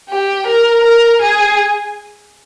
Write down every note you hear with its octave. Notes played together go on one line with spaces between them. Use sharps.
G4
A#4
A#4
G#4